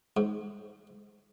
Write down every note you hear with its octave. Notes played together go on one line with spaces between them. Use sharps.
G#2